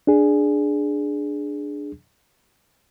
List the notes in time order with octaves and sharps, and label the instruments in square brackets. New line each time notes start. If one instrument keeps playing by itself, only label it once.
[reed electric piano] D4 G#4